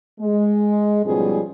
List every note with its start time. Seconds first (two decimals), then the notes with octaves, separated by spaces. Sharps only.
0.20 G#3
1.05 G#2 B2 F3 G3 C#4 G#4